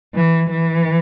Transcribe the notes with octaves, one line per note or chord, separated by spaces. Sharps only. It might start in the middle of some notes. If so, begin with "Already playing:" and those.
E3
E3